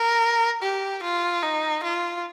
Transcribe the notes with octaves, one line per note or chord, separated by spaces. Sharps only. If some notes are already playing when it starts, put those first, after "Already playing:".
Already playing: A#4
G4
F4
D#4
F4